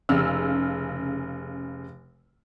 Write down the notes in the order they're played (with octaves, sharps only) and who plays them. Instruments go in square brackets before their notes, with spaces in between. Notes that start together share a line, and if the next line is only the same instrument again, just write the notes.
[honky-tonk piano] F1 C#3 E6 F6